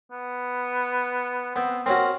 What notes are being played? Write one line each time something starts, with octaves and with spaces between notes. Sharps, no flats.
B3
B3 C4
C4 C#4 F#4 A#4